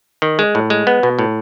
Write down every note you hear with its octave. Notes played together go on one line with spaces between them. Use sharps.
D#3
G#3
A2
G#3
B3
B2
A2